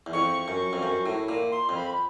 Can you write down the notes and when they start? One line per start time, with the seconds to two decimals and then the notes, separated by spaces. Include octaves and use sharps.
0.06 E2
0.13 F2 C#6
0.48 F#2
0.73 F2
0.83 F#2
1.06 A2
1.29 A#2
1.52 C6
1.69 F2
1.75 B5